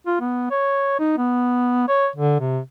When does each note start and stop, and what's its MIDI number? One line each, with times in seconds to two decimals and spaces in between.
0.06 0.16 65
0.20 0.46 59
0.51 0.96 73
0.99 1.13 63
1.17 1.84 59
1.88 2.07 73
2.16 2.39 50
2.39 2.59 48